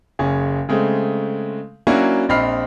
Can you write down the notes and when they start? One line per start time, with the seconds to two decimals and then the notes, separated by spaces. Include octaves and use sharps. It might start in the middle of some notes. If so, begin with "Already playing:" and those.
0.19 F#1 C#4 G#4
0.69 C#3 G#3 A3 C4
1.87 F#3 A#3 C#4 D4 E4 F#4
2.29 A#1 C4 D#5 B5 F6 C7